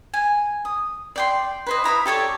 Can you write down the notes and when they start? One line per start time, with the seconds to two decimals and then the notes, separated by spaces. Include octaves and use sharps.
0.14 G#5
0.65 D#6
1.16 D5 G5 C6
1.66 B4 C5 D#5
1.84 E4 A#5 B5 D#6
2.06 G4 A4 C#5 D5